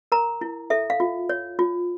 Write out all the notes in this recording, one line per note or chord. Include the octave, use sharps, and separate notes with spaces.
A#4 A#5
E4
A4 E5
F5
F4
C#5
F4